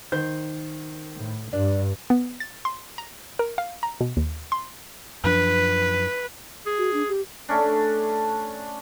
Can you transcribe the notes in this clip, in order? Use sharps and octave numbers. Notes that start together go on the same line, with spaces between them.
D#3 C5 G6
A2
G2 D4
B3
A6
C6
A#5
A#4
F5
A#5
B2
D#2
C6
F#2 F3 D4 B4
G#4
F#4
D4
G4
A3 C#4 D4